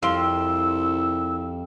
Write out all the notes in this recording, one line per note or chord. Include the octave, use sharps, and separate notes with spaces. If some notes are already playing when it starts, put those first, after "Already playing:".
C2 F2 F5 G5 C6 E6